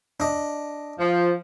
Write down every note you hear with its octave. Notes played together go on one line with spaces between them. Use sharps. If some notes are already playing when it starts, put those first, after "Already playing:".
D4 D#5
F3